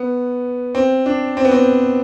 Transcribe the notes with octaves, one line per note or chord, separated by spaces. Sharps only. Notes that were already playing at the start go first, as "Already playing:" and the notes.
Already playing: B3
C4
D4
C4
B3
C4